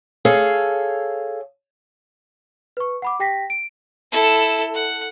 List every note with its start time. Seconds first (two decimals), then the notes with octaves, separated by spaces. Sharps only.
0.25 G#4 A4 C#5 F5
2.77 B4 C#6
3.02 F#5 B5 D6
3.20 G4 G5 A#6 B6
3.50 D7
4.12 E4 A4
4.74 F#5